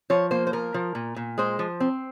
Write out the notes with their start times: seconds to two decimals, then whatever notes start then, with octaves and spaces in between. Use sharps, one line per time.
0.10 F3 C#5
0.31 A#3 C5
0.47 C5
0.53 F3 A#4
0.74 F3
0.95 A#2
1.16 A#2
1.38 G#3 C5
1.59 F3
1.80 C4